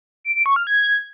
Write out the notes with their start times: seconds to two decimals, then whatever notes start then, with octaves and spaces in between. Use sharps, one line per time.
0.24 D7
0.35 D7
0.46 C#6
0.56 F6
0.67 G#6